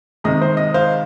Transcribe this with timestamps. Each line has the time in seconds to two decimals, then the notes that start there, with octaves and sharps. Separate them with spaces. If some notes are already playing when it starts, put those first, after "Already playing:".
0.24 C3 D#3 G#3 D#5
0.42 C5
0.57 D#5
0.74 C5 F5